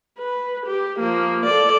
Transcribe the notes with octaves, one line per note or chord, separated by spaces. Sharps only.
B4
G4
F3 A#3
A4 D5